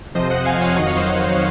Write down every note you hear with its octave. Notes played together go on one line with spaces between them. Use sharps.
F2 C3 F3 C5 D#5
D#5 F#5
F5 G#5
C#5 F5
F2 D#3 F#3 D#5 F#5
C#5 F5
C5 D#5